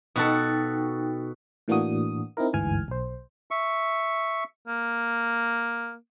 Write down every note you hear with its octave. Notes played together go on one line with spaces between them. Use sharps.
B2 D#4 F#4 A4 G5
A2 E3 A#3 D4 F#4 D#6
C4 D#4 E4 A#4
G1 D2 G#2 E3 G#5 F6
B1 C5
E5 C#6
A#3